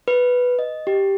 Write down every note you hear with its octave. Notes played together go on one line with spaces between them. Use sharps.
B4
D#5
G4